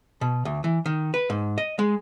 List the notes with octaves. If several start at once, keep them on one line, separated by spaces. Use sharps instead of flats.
B2
D2
E3
D#3
B4
G#2
D#5
G#3